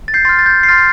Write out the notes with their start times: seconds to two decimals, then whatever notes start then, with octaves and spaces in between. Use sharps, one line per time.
0.08 A6
0.14 G6 C7
0.25 C6 F6 A6
0.39 A6
0.46 G6
0.63 C7
0.68 C6 F6 A6